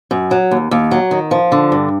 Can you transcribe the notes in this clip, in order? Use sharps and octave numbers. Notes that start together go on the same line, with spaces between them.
F#2
F#3
D#2
D#2
F#3
D#3
F3
D3
G2